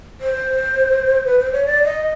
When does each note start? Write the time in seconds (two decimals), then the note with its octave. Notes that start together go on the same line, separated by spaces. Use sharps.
0.21 C5
1.26 B4
1.40 C5
1.53 C#5
1.66 D5
1.84 D#5